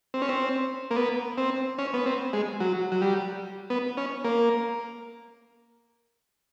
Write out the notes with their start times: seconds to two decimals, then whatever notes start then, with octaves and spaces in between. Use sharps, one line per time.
0.14 C4
0.22 C#4
0.29 C4
0.91 A#3
0.96 B3
1.38 C4
1.78 C#4
1.94 B3
2.06 C4
2.33 G#3
2.60 F#3
2.92 F#3
3.01 G3
3.70 B3
3.97 C#4
4.24 A#3